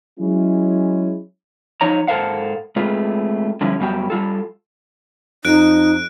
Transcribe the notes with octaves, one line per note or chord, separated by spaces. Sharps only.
F#3 G#3 C#4 E4
F3 D#4 C#5 A#5
G#2 A4 A#4 C5 F5 F#5
G#3 A3 C4 F4 G#4 B4
D3 F3 G3 C#4 E4
F#2 G3 B3 F#4 G4 G5
G3 F4 A4
F2 D#4 F#6 D7